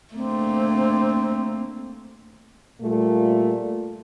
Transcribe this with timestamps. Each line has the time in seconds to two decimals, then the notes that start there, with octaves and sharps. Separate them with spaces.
0.15 A3 A#3 C4 D4
2.82 A#2 G3 A3 F4